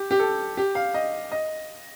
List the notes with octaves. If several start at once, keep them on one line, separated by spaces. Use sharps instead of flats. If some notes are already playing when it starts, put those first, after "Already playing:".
Already playing: G4
G4
A4
G4
F5
D#5
D#5